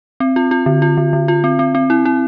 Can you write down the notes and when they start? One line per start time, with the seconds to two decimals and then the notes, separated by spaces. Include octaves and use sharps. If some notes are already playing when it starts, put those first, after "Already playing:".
0.20 C4
0.36 F4
0.51 F4
0.66 D3
0.82 F4
0.97 D3
1.13 D3
1.28 F4
1.44 C4
1.59 C4
1.75 C4
1.90 E4
2.05 E4